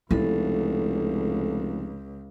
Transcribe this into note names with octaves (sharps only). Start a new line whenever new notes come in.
F1 C#2 E4 A4